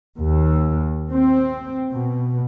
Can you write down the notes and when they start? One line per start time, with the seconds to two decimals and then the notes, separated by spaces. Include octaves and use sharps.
0.18 D#2
1.12 C4
1.91 B2